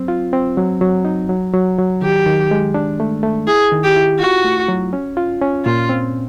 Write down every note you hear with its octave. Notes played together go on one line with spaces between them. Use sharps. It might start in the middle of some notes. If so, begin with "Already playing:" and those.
Already playing: F#3 C4
F4
C4
F#3
F#3
D#4
F#3
F#3
F#3
D#3 G4
D#3
G#3
D4
A3
A3
E4 G#4
D#3
G4
E4
F4 F#4
A3
F#3
C#4
F4
C#4
A#2 F4
C4